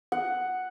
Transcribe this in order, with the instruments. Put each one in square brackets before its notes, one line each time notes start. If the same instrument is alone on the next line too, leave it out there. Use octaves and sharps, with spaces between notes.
[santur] F#5